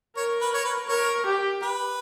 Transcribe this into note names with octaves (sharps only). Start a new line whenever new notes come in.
A#4 C#5
B4
C#5
B4
A#4 C#5
G4
B4